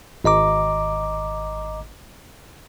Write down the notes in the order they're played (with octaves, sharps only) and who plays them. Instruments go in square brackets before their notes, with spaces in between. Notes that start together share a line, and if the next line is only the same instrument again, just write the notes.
[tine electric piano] G#1 D#5 A#5 D6